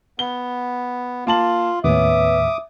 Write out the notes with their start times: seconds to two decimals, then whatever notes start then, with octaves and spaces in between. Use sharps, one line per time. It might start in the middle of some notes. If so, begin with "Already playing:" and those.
0.19 B3 G7
1.27 A#3 F4 A5 F#7
1.84 D#2 A2 B3 C#4 E5 D6 D#6